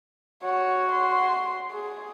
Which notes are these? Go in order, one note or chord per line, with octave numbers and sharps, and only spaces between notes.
F#4 C#5
C6
G#4